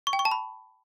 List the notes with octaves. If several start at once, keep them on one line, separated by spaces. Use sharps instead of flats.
C#6
G5
C#6
A5
B5